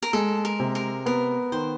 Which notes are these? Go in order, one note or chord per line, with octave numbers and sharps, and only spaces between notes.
A#4
G#3 A4
A#4
C3
A#4
B3 A#4
D#3 C5